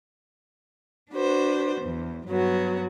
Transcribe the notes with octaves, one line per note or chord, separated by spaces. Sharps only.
D4 F#4 B4 C5
E2
G2 F#3 B3 F#4